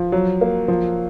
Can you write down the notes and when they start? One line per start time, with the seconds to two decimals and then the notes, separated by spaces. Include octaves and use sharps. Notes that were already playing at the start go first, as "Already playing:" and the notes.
Already playing: F3
0.12 F#3
0.41 A#3
0.68 F3